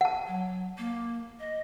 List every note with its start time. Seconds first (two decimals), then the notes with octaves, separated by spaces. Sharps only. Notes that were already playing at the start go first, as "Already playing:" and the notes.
0.01 F#5 A5
0.27 F#3
0.78 A#3
1.40 D#5